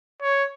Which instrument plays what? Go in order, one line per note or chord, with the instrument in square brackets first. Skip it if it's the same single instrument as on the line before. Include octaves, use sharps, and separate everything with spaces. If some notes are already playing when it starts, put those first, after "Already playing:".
[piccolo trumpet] C#5